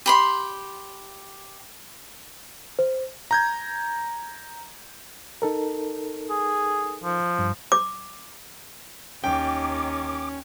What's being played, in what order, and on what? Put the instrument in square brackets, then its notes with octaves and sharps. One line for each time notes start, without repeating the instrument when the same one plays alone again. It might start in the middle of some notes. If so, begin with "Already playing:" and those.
[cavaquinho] G4 B5 C6
[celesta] C5
[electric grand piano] A#5 G6 G#6
[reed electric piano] D#4 A4 A#4
[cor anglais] G#4
F3
[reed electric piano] G2
[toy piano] D6
[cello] D#2 D#3 [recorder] C#4 [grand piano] G5 [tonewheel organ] D6